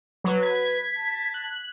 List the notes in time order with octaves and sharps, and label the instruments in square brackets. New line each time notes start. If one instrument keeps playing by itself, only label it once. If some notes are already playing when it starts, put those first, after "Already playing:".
[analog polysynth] F#3 [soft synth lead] B4
[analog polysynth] G#6 B6
[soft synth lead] A5
[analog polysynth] F#6